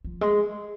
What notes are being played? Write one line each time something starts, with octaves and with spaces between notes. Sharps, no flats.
F3
G#3